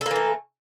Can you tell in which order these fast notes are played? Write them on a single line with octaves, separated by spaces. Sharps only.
A4 A#3 E3 A3